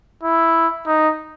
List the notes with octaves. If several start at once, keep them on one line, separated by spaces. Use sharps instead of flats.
E4
D#4